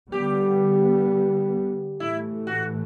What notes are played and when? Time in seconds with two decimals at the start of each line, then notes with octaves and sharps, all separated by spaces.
0.12 D3 G3 B3 G4
2.00 A2 E3 A3 E4
2.47 F#4